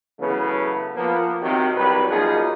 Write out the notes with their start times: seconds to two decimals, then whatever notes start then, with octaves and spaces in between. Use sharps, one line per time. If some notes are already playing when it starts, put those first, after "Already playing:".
0.20 C#3 E3 F#3 A3 B3
0.95 F3 A#3 B3
1.42 C3 D#3 F#3
1.77 C2 F#3 G4 B4
2.09 F#2 F3 A#3 B3 D#4 G#4